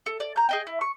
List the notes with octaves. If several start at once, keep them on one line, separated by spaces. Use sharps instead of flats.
A4
D5
A#5 G6
G#4 D#5 G5
E4
C#6